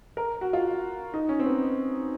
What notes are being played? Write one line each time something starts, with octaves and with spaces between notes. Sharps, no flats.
A#4
F#4
F4
D#4
C#4
C4
B3